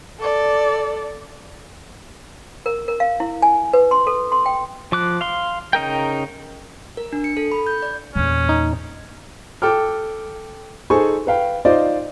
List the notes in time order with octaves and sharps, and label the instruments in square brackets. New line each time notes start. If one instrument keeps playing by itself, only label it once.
[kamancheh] A4 D5
[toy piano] A#4
A#4
F5
E4
G#5
B4
C6
A4
C6
G5
[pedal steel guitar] F3 D6 F#6
F5 C6
C#3 D#4 A#4 G5
[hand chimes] A#4
D4
C#7
A4
B5
G6
D5
[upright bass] E2 A#2 [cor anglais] C#4
[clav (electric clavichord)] D#4
[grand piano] A4 G5 D6 F6
D#4 G#4 A4 C5 G#5 C#6
B4 F5 G5
D#4 F4 C5 D5 D#5